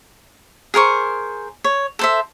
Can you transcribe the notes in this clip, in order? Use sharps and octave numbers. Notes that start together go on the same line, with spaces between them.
G#4 A#4 C5 C#6
C#5
A4 C5 E5